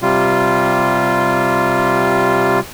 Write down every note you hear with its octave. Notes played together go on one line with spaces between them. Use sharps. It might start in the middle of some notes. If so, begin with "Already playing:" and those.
C3 G3 F4